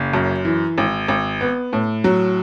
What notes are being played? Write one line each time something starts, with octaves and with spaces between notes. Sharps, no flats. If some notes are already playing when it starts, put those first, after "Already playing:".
Already playing: F#1
F#2
E3
G#1
G#1
B3
A2
F#3